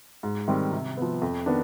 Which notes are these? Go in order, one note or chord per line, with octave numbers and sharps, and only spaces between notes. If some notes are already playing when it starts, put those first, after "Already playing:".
G#2
D#3 G3 C4
C3
F3 B3
F2
D#3 B3 D4